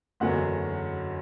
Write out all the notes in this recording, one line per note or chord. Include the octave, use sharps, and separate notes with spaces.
F#1 E2 D3 F#3 F#4 F#5